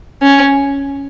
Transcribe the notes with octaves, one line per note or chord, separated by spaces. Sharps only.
C#4